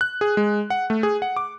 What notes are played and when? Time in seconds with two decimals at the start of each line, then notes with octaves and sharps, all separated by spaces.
0.01 F#6
0.21 G#4
0.37 G#3
0.70 F#5
0.90 A3
1.03 G#4
1.22 F#5
1.37 D6